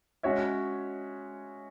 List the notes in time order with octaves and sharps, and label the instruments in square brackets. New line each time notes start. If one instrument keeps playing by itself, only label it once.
[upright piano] G#3 C#4 F#4 C#5 E5